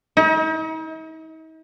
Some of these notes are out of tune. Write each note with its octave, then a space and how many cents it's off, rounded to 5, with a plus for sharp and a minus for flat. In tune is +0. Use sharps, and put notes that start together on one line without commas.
D#4 +45